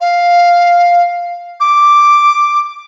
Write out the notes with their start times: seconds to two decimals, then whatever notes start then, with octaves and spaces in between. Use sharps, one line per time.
0.01 F5
1.60 D6